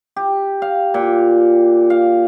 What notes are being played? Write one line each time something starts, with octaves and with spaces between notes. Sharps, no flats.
G4
F5
A#2
F5